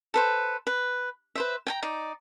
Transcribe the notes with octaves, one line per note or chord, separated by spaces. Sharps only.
A4 B4 C5
B4
B4 C5 E5
G5 G#5 A#5
D#4 D5